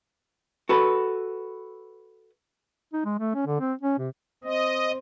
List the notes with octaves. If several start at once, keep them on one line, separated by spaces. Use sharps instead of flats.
F#4 A4 B4
D#4
G#3
A3
C#4
D3
C4
C#4
C3
C4 D#5